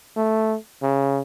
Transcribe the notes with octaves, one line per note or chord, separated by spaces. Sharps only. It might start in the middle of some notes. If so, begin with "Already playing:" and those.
A3
C#3